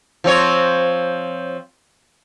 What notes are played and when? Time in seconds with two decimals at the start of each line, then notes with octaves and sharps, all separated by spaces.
0.24 F3 C4 C#5